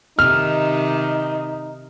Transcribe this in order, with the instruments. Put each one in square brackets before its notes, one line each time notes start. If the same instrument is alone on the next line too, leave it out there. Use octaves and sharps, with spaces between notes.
[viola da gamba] C3 D#3 [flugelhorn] D#4 [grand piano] F6